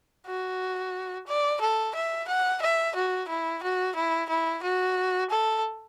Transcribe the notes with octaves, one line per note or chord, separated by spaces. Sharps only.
F#4
D5
A4
E5
F#5
E5
F#4
E4
F#4
E4
E4
F#4
A4